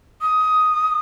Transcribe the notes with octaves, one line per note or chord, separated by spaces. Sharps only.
D#6